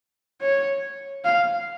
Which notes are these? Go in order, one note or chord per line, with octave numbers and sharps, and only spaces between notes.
C#5
F5